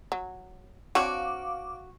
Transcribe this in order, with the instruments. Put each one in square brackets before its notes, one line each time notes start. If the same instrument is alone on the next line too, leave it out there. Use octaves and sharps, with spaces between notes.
[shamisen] F#3
[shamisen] C4 D4 C#5 [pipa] F#4 [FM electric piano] F5 D6